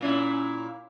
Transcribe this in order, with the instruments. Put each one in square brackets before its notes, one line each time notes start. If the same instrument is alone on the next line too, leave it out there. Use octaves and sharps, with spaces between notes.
[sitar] A#2 C#4 E4